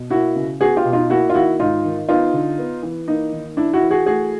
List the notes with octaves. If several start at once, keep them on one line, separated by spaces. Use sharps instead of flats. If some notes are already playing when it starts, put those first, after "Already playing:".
Already playing: B2
A#3 E4 F#4
C#3
B3 F#4 G#4
F4 G4
B2
D#4 F4
A#3 E4 F#4
F4
D#3 E4 F#4
G#2 D#4 F4
D#3
B3 D#4 F4
D3
B3
E3
A#3 D#4
D#3
D4 E4
E4 F#4
E3
F#4 G#4
A3 F#4 G#4